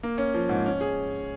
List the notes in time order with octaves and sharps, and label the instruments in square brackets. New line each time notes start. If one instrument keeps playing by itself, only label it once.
[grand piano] A#3
C#4
F3
G#2
C#4
G#4